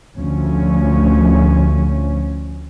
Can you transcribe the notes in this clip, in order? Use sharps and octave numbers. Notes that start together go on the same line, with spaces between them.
D2 F3 C#4